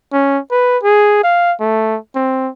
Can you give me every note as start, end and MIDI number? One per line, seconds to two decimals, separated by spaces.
0.13 0.39 61
0.51 0.78 71
0.83 1.20 68
1.24 1.53 77
1.60 1.97 57
2.16 2.50 60